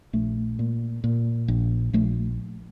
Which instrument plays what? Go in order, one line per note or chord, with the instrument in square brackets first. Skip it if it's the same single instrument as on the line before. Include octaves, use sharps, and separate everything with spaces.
[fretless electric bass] A#1 A3
A#2
A#2
A#1
A#1 A3